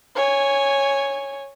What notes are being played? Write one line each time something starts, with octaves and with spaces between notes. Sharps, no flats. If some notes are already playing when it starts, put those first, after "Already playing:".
C#5 G#5